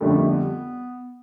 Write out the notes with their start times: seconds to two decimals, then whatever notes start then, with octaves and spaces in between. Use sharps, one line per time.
0.01 F2 D3 G3 A3 D4 F4
0.28 B3